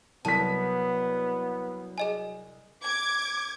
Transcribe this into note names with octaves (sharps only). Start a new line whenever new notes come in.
C2 F#3 B3 A5 B6
G#4 D#5 G#5
D6 G#6